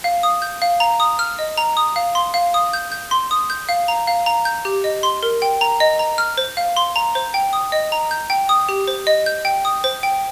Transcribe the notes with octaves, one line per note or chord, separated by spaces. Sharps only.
F5
D#6
G6
F5
A#5
D#6
F6
D#5
A#5
D#6
F5
C6
F5
D#6
G6
G6
C6
D#6
G6
F5
A#5
F5
A#5
G6
G4
D#5
C6
A#4
G5
A#5
D#5
A#5
F6
C5
F5
C6
A#5
C5
G5
D#6
D#5
A#5
G6
G5
D#6
G4
C5
D#5
G6
G5
D#6
C5
G5